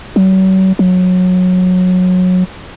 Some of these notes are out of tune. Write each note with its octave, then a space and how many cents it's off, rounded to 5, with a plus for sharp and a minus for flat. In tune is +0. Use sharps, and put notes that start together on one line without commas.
F#3 +40
F#3 -20